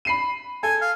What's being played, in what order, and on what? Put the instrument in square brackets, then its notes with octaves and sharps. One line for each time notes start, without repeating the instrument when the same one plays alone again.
[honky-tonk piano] B5 C7 D#7
[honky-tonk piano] A4 [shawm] G#5
[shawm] F5